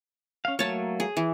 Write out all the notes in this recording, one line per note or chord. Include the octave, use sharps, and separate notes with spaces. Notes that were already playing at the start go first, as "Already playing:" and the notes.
C#4 F5
F#3 A3 A#3 C#5 A5
G#4
E3